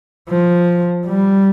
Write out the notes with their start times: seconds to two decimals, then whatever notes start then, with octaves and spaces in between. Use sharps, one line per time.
0.29 F3
1.07 G3